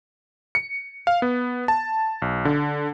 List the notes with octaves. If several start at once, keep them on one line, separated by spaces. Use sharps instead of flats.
C#7
F5
B3
A5
B1
D3